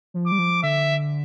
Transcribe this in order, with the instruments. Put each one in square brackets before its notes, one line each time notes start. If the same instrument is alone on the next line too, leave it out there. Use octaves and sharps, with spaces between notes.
[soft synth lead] F3
[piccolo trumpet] D6
[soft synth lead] G3
F3
[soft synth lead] D3 [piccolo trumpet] E5